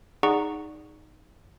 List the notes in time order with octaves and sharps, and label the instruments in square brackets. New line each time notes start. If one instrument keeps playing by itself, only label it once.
[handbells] D#4 G#4 D5 F#5 A#5 C#6